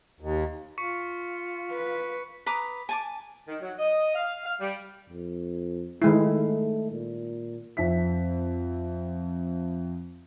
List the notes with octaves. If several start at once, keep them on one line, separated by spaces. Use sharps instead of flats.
D#2
F4 C#6 B6 C#7
B4
B4 A#5 D6 D#6
G#5 A5 D6
D#3
F#3
D#5
F5
F5
G3
F2
D#3 G#3 A3 E4
A#2
F2 C4 E5 B6